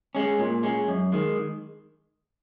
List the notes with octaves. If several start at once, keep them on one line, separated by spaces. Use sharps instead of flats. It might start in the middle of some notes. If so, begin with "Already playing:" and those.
G#3 C#4
A#2
G#3 C#4
F#2
D#3 G#3